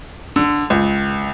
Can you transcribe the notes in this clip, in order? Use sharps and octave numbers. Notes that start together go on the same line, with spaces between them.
D3
C#2